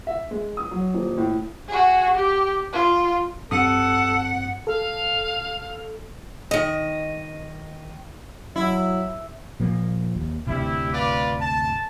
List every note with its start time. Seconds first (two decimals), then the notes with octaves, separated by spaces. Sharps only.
0.07 E5
0.31 G#3
0.57 D#6
0.71 F#3
0.94 D#1
1.18 A2
1.68 F#4 G#4
2.15 G4
2.73 F4
3.51 G2 C4 A4 F#5 D#6
4.67 A4 F5
6.51 D#3 D#5
8.56 F#3 E4
9.60 A#2 F3 A#3
10.15 D#2
10.47 D2 G2 C3 G3 E4
10.93 F4 B4 D5
11.40 A5